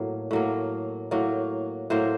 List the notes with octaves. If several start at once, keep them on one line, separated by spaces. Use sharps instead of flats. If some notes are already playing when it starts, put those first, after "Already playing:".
Already playing: A2 F#3 A#3
A2 F#3 A#3
A2 F#3 A#3
A2 F#3 A#3 C5